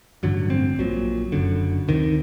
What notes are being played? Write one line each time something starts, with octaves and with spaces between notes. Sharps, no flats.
A1 G2 D3 F#3
C4
A#1 A#2 F#3
F#1 F#2 D3
D2 C3 D#3